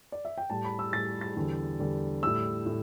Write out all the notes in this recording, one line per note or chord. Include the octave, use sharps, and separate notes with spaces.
D5
E5
G5
A2 G3 A5
B5
E6
A2 G3 A6
A6
E2 D3 G3
E2 D3 G3
A2 G3 E6
A2